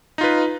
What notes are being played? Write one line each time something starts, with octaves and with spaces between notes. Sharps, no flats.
D#4 F4 B4